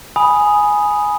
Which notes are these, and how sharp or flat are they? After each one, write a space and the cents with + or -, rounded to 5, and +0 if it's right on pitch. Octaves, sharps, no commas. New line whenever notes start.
G#5 +0 B5 -5 D#6 +0